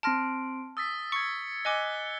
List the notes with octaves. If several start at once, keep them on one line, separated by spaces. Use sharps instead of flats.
C4 A5 C6 F6 A#6 D7
D#6 E6 A6 B6
C#6 G#6 C#7
D#5 G#5 D6 F#6 G7